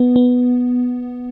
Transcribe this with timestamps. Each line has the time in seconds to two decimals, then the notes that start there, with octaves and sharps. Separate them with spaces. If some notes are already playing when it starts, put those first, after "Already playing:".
Already playing: B3
0.16 B3